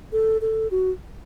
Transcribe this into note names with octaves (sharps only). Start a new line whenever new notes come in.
A4
A4
F#4